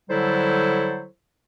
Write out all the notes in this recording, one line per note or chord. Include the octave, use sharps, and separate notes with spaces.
D3 F#3 G3 E4 A4 C5